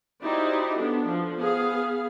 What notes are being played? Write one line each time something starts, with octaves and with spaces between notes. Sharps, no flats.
D#4 E4 F#4 G4 C5 D5
B3 D4 A4
F3
B3 G#4 F5